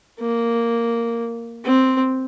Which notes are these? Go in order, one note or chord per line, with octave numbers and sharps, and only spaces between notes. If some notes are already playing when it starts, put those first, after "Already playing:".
A#3
C4